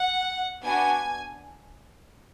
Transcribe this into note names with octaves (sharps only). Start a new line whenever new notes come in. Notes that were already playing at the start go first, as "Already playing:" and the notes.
Already playing: F#5
B3 D4 F#4 G#5